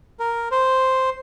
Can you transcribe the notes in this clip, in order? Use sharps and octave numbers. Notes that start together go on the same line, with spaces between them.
A#4
C5